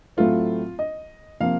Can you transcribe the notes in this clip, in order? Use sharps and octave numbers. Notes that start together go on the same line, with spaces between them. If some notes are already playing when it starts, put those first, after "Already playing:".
A2 F#3 A3 C4 F4
D#5
C3 F3 A#3 F5